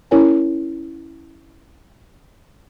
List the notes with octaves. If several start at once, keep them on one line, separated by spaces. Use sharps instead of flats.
C#4 E4 A#4 C#5 G#5